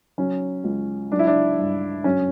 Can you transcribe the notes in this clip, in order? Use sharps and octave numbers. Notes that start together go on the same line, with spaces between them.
F#3 C#4
C#2
F#3 D4
E4
D4
G2
F#2 C#4